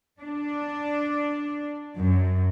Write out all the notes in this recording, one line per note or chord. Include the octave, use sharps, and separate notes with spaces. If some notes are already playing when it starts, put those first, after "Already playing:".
D4
F#2